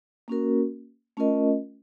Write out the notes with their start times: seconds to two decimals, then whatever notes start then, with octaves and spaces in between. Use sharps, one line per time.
0.28 A#3 C#4 F#4 A#4
1.17 A3 C#4 F4 A#4 D#5